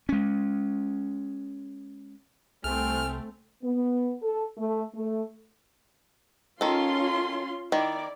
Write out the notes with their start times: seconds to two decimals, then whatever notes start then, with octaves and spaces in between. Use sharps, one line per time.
0.09 G#3 C#4
2.64 C2 A3 C4 G#5 F6
3.63 B3
4.23 A4
4.57 A3
4.94 A3
6.61 D#3 C#4 F4 A4 C6
7.72 D#3 E4 D5